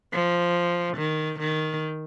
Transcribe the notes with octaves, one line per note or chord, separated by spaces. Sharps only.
F3
D#3
D#3